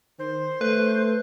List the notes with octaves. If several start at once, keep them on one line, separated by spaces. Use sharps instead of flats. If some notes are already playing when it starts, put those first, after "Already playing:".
D#3 C5
A3 B4